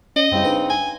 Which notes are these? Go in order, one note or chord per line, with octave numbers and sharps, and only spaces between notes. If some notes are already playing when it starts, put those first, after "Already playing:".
C#4 D#5
F#2 C#3 G3 C4 E4
D4 D#4 B4
G#5